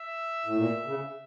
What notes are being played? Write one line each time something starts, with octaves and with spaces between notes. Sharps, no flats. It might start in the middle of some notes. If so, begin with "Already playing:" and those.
Already playing: E5
A2
A#2
C#3